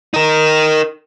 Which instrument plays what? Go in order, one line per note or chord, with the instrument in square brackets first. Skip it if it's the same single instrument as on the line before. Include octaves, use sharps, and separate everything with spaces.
[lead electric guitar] D#4 A#4